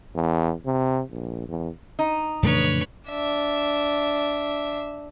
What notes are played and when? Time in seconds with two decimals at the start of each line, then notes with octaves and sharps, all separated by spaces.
0.15 E2
0.66 C3
1.11 A#1
1.49 E2
1.99 D#4
2.43 F2 A#2 C#3 E3 A3 D4 B4 C#5
3.09 D4 E5